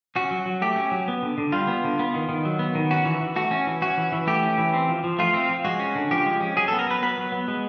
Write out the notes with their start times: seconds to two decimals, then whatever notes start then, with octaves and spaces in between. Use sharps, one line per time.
0.16 C#4 F#4
0.31 F#3
0.46 F#3
0.62 A3 G4
0.76 C#4
0.92 F#3
1.08 B3
1.22 D3
1.38 D3
1.52 G3 F4
1.68 B3
1.84 D3
1.99 B3
2.14 D#3
2.29 D#3
2.45 F#3
2.59 B3
2.75 D#3
2.91 C#4 F#4
3.05 E3
3.21 E3
3.36 A3 F#4
3.51 C#4
3.67 E3
3.82 C#4 F#4
3.98 E3
4.12 E3
4.27 A3 G4
4.43 C#4
4.58 E3
4.74 C4
4.89 F3
5.04 F3
5.18 A3 F4
5.34 C4
5.49 F3
5.65 G#3 F#4
5.80 C#4
5.95 D3
6.11 F3 G4
6.26 G#3
6.41 C#4
6.56 F#3 G#4
6.68 A4
6.72 B3
6.79 A#4
6.86 F#3 B4
7.02 B3 B4
7.17 F#3
7.32 B3
7.48 G#3